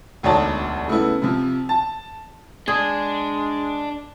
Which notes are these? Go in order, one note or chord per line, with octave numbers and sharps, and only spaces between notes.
E1 D2 D#4 C#5 D5 A5
C#3 A3 B3 E4
C3 F3
A5
G#3 D4 G#4